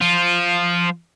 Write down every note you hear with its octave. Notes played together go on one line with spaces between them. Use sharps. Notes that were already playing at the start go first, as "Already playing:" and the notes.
F3 F4